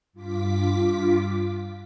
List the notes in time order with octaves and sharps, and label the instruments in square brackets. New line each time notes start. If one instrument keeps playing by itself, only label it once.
[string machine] G2 F4 D6 B6